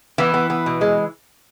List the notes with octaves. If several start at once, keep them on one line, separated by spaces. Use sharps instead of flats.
E3 B3 E4
B3
B3
B2
G#3